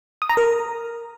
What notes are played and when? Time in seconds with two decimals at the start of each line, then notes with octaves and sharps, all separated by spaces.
0.22 D#6
0.29 A#5
0.37 A#4